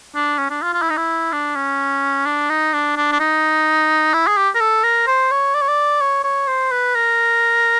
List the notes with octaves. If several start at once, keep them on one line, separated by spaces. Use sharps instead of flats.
D4
C#4
D4
F4
F4
E4
D#4
E4
D4
C#4
D4
D#4
D4
D4
D4
D#4
E4
G#4
G4
A#4
A4
A#4
C5
C#5
D5
C#5
D5
C#5
C#5
C5
B4
A#4